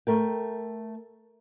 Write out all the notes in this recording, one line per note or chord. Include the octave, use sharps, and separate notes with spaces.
A3 A#4 G5